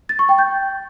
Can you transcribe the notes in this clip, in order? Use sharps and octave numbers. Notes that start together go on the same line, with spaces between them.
A6
C#6
G5
G6